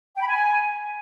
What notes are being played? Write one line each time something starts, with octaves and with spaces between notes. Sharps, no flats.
G5
B5
G#5